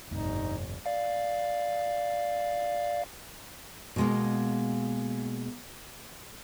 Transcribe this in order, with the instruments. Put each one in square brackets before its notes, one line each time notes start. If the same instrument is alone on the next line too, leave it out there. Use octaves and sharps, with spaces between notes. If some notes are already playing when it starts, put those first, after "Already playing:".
[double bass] G1 [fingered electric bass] F2 A2 C3 [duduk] D#4
[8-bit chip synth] D5 F5
[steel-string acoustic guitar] B2 G#3 A#3